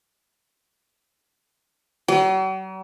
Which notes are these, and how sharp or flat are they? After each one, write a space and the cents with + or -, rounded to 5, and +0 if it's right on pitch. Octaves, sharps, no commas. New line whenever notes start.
F#3 +45